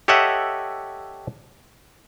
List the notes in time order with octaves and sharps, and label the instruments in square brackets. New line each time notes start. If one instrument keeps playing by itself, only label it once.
[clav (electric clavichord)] G4 A4 C#5 D#5 E5 F#5